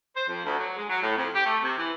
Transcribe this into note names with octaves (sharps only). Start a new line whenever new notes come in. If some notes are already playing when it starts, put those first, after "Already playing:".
C5
F2
D2
F#3
G#3
F#3
A2
F2
G4
A3
C3
E3